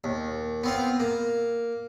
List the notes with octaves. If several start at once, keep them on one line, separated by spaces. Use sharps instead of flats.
D#2
B3 C4 F4
A#3